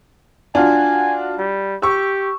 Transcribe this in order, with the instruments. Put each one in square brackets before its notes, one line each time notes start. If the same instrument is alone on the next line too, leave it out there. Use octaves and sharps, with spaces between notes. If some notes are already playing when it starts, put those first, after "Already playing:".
[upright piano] D4 F4 F#4 [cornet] G#5
[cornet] G3
[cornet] G4 [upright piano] C#6 E6